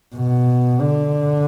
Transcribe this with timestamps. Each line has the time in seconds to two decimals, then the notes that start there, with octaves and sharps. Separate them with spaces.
0.16 B2
0.81 D3